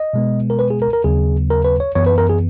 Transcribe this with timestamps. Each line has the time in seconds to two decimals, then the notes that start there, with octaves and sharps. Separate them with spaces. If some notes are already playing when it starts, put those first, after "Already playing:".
Already playing: D#5
0.13 B2 G#3 B3
0.50 A#4
0.59 B4
0.70 G#4
0.82 A#4
0.93 A#4
1.04 D#2 C#3 F#3 B3 G#4
1.50 A#4
1.64 B4
1.80 C#5
1.95 F#2 E3 B3 C#5
2.06 B4
2.18 A#4
2.29 G#4